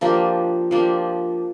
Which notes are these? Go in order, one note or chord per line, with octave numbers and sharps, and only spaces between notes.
F3 A#3 D4 G4
F3 A#3 D4 G4